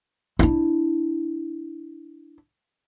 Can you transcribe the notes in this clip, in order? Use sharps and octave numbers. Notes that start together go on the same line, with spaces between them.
D4 E4